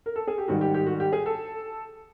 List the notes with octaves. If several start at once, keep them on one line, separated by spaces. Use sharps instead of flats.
A#4
A4
G#4
G4
G#2 D#3 G3 F#4
G4
G4
F#4
G4
G#4
A4